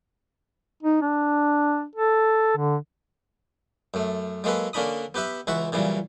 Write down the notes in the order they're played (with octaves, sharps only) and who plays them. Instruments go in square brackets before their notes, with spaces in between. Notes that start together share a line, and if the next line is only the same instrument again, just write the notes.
[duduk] D#4
D4
A4
D3
[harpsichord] F#2 A3
F#3 G#3 A#3 A4 B4
D3 A#3 C#4 D4 B5 D#6
B3 G4 B4 E5 B5
C#2 E3 F#4 E5 F#5
A#2 C#3 E3 F#3 G3